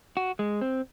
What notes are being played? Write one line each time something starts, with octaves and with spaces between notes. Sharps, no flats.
F#4
G#3
C4